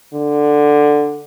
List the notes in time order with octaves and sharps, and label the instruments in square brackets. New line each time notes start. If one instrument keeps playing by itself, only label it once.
[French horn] D3